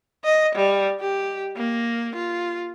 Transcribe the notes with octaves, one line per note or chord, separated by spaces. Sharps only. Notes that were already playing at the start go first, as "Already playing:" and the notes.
D#5
G3
G4
A#3
F4